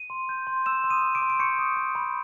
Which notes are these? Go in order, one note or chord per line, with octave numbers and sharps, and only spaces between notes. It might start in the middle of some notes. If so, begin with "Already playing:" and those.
Already playing: D#7
C6
G6
C6
C6 E6 E7
C6
D#6 D#7
C6
D6 D7
C6
D7
C#6 G6 C#7
D#6
D#6
B5